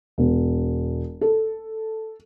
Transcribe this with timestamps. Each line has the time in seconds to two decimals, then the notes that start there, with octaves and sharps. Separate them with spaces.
0.18 E1
1.21 A4